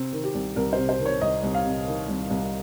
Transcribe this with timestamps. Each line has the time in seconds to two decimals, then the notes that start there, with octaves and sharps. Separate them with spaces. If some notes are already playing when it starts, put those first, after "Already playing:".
Already playing: C3 C4
0.13 D#3
0.24 G4
0.35 C2
0.56 C2 A#4
0.73 C5
0.78 C3
0.89 C5
1.00 D#3
1.05 C#5
1.22 C2 D#5
1.43 C2
1.54 F5
1.65 C3
1.88 D#3
2.09 C2
2.31 C2